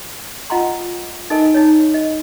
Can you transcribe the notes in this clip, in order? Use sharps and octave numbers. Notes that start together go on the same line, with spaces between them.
F4 D#5 F#5 G5 A#5 C6
D#4 A4 A#4 D#5 G#5
D#4 C#5
D#5